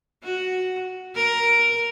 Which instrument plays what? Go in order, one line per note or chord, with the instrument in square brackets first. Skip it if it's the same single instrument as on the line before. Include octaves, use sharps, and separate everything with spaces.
[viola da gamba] F#4
A#4